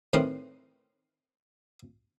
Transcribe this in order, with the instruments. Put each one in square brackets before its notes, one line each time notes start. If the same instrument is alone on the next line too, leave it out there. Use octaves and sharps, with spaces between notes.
[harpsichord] A2 D#3 C4 C#4 B4 C6